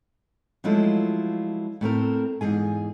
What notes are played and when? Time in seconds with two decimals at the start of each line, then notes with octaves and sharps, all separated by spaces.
0.64 F3 F#3 G#3 A3 E4 F4
1.81 A2 A3 C4 A#4
2.41 E2 G#2 G#4 G#5